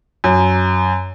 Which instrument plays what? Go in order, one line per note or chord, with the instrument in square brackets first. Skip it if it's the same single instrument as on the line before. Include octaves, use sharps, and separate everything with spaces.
[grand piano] F#2